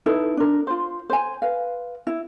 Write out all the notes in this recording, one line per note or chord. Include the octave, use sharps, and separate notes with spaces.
D#4 E4 A4 B4
D4 A#4
F4 C5
C5 G#5
B4 F5
E4